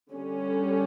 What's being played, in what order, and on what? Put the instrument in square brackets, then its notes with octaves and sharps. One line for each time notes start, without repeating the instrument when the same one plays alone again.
[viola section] D3 G3 C#4